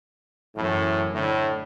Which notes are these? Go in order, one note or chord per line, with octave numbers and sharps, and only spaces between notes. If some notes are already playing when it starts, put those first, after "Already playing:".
F#2 A2 E3
A2 D3